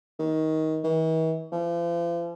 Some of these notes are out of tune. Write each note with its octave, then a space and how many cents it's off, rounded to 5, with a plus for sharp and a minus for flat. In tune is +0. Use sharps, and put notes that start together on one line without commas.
D#3 +20
E3 -45
F3 -40